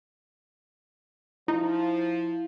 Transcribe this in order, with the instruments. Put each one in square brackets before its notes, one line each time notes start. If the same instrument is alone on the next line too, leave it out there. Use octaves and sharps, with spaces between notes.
[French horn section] F3 [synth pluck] D#4 [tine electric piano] E4